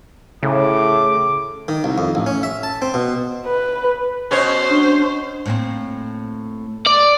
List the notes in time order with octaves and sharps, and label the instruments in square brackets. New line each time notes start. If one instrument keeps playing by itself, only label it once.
[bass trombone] A2 [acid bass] C#3 [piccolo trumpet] D6
[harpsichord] D#3
C2
F2
A1
C#4
E5
A5
C4
B2
[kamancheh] B4
[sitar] B2 C#4 C#5 [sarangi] C5
[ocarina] D4
[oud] A2 A#3 C4
[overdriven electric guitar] D5